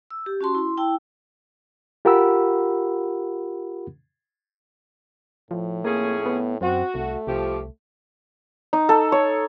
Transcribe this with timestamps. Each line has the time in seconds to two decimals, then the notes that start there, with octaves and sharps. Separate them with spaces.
0.11 E6
0.26 G4
0.41 C#4 F#4 A5 C6
0.55 E4 C6
0.77 E4 G5 A5 E6
2.05 F4 G4 A#4 F#5 B5 E6
5.51 A2 F3
5.85 F2 A#3 C#4 G#4
6.26 B3
6.61 F#2 C4 F#4
6.95 C2 A3
7.27 C2 F3 G4
8.73 D#4
8.89 A4
9.12 C#5